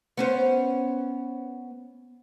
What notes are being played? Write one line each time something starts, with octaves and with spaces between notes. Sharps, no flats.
B3 C#4 C5